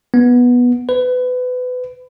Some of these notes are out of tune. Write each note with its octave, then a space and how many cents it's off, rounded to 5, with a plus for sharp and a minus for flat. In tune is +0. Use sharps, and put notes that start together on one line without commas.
B3 -10
B4 +25